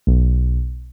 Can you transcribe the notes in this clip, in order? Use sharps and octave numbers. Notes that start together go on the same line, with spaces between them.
B1